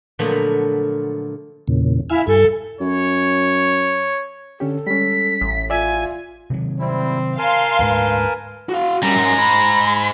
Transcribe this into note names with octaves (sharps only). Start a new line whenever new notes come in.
A#2 D3 F3 F#3 A3 B3
E2 A#2 C#3
E4 E5 F5 G#5
G2 A4 G#5
F#2 C#5
D3 C#4 G4 A4
G3 G#3 C#4 B6
A1
F4 D5 E5 G#5
C3 D#3 F#3
G3 C4 E4
A#4 F5 G#5 A5 C6
D2 G#2 B4
F#4 F5
G3 C#4 A#4 A#5
G#2 G#3
B5